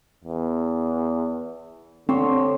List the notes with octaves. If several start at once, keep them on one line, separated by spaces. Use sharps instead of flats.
E2
D3 C4 G4 C5 C#5